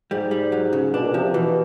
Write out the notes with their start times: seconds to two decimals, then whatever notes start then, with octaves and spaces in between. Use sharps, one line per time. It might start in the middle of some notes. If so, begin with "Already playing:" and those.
0.11 G#2 G3
0.31 G3
0.52 F#3
0.73 C#3
0.94 B2 D4
1.03 A#2
1.14 C3 F3
1.24 C3
1.34 B2 E3